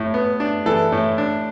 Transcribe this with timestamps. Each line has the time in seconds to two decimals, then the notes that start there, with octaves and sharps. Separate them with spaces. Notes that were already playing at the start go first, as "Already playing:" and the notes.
Already playing: A2
0.14 B3
0.40 D4
0.66 E3 A4
0.92 A2
1.18 D4